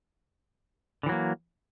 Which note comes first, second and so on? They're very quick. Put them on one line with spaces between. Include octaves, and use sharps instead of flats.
D3 E3 F#3 A#3